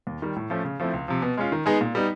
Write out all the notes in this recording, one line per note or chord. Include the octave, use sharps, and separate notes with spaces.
D#2
D#3 G3
A2
F3 A3 C#4
C#3
F3 A3 C4 E4
C#2
C3 F3
B2
G#3 C#4 F4
D#3
G#3 B3 D#4 G#4
A#2
G3 B3 D#4